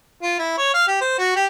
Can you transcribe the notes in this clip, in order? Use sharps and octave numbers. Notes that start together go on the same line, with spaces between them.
F4
E4
C#5
F5
G4
C5
F#4
G4